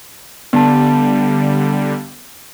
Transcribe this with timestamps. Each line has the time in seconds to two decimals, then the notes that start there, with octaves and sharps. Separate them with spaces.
0.53 D3 G3 B3 A5